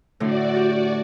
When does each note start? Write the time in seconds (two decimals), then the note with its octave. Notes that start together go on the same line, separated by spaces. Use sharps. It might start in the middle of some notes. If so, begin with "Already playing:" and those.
0.20 A2 D3 F#4 D5
0.57 G4